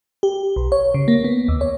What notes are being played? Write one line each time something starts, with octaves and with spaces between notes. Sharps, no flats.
G4
B1
C#5
C#3
A#3
B3
D#2
C#5